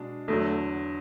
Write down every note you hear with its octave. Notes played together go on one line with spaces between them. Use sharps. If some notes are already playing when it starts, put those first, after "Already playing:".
Already playing: B2 G#3 D4
E2 D3 F#3 A3